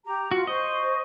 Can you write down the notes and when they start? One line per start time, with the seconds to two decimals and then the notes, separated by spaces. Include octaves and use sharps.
0.05 G4 A#5
0.31 F4 F#4
0.47 C5 D#5 C#6